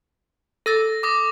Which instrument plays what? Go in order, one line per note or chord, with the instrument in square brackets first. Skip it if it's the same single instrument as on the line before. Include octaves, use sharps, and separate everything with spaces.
[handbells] A4 E6 A6 [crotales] A#6
[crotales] D6 D#6 A#6